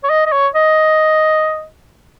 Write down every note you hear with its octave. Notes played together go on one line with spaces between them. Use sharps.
C#5
D#5
D#5
C#5
D#5